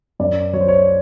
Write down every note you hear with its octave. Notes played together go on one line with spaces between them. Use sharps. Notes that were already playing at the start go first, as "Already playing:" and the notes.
F#2 D5
F#3 C#5
C5
C#5